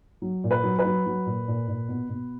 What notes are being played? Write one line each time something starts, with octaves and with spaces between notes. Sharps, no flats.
F#3
A#2
B4
F#3
B4
F#3
F#3
A#2
A#2
A#2
B2
B2